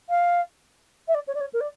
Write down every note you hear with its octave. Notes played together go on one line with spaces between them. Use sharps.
F5
E5
D5
C#5
D5
C#5
A#4
D5